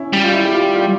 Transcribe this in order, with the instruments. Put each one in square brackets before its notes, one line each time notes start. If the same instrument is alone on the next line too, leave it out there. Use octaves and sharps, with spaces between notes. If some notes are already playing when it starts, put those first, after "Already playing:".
Already playing: [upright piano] C#4 E4
[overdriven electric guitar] G3
[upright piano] F4
E4
G4
F4
F4